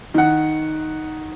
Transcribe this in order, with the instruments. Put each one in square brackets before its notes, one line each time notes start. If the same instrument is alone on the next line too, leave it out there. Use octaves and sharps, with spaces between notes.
[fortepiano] D#3 F#5